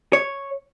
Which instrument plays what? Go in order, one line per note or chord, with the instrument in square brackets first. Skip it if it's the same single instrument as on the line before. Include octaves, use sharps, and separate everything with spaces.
[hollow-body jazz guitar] C#5